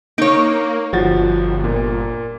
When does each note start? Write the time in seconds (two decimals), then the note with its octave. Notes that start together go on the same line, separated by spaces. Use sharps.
0.18 A#3 D#4 C#5 D7
0.93 G1 F3 F#4 A6
1.64 A#2